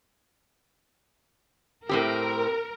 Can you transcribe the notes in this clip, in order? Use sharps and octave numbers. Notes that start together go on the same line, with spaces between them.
A2 C4 G4 A#4